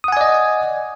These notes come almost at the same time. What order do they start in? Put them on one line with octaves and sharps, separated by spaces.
D#6 F#5 G#5 D5 D#5